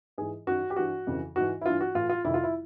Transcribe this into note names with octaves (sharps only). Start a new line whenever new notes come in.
G#2 E3 G#4
F#2 D#3 F#4
G4
G2 E3 F#4
F2 C#3 E3
G#2 E3 F#4
E4
G2 E3 F4
F#4
A2 E3 F4
F4
F2 C3 D#3 E4
F4
E4